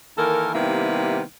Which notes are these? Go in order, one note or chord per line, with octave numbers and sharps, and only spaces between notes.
D#3 E3 A#3 A4 A#4
C3 D#3 G3 A#3 B3 E4